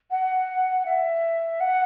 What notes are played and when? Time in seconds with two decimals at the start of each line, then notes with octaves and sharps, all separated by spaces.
0.10 F#5
0.86 E5
1.60 F#5